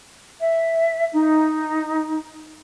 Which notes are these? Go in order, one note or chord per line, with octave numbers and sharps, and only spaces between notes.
E5
D#4